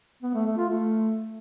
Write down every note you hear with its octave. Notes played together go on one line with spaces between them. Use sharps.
B3
A3
A3
F4
A3